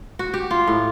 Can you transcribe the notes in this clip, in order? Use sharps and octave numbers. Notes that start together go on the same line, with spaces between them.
F#4
G4
F4
A2